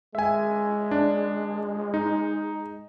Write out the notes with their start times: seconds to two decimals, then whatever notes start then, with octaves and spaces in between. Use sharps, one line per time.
0.15 G#3 E5 G#5
0.91 D4
1.94 D#4